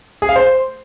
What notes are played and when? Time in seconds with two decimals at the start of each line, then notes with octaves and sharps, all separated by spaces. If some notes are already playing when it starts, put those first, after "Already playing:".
0.22 G#4
0.29 F5
0.36 C5